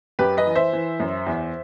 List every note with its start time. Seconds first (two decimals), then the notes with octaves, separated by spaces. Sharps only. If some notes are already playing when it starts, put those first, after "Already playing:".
0.19 F#2 G4 B4
0.37 B4 D#5
0.46 E3
0.55 C5 E5
0.73 E3
1.00 F#2
1.27 E2